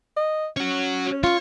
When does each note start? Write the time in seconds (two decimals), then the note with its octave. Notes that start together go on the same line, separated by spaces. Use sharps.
0.17 D#5
0.57 C#4 F#4 C#5
1.24 F4 C#5